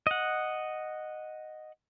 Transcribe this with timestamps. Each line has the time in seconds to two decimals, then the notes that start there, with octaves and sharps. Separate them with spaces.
0.07 D#5 F#5